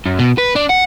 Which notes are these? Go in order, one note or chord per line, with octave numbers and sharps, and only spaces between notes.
F#2
B2
B4
D4
F#5